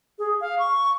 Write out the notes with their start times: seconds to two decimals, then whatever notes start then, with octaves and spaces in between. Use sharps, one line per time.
0.19 G#4
0.41 F5
0.59 C#6